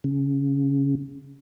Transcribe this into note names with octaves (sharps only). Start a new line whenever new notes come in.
C#3